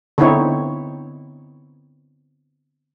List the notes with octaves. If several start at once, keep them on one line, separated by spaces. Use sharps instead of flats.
D3 B3 C4 D#4 E4 C#5